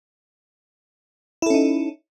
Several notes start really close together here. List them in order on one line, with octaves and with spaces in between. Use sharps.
E4 A4 C#4 D#4